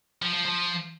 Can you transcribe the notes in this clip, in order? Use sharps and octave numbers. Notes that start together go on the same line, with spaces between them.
F3
F3
F3